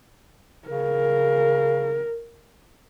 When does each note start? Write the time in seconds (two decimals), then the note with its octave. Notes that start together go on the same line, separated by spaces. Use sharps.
0.69 C#3 A#4